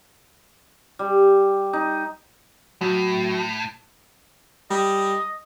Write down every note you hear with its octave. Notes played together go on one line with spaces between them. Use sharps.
G3
D#4
A2 F#3
G3 D#5